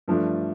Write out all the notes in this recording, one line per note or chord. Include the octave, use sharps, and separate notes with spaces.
G2 F3 A3 D4